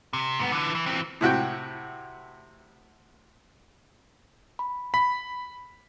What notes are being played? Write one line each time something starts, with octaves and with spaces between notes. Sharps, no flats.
C3
G#2 B3
D3 E3
E3
E3 C4
A2 C3 F#4 G5
B5
B5 B6